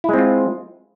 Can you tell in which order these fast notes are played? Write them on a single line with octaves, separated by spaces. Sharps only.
E4 G#3 C4 F4